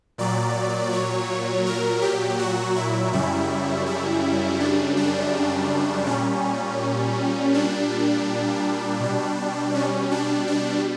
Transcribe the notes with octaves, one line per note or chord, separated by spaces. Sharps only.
A#2 F#3 D5
C#5
A#4
G4
F#4
E4
F#2 C#3 G3 E4
E4
D4
D4
A#2 G3 C#4
D4
B2 G3
C#4
D4
D4